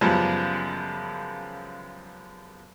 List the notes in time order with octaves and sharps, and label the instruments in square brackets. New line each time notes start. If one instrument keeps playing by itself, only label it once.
[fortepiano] F#2 C#3 F3 G3 G#3 B3